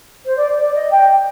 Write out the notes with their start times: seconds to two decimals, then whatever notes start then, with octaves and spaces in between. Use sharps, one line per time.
0.25 C5
0.36 D5
0.58 D5
0.74 D#5
0.91 G5